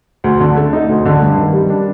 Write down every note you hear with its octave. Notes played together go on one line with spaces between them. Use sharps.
D2
D3
A3
D#4
D2
D3
G2
D#3
G3
D4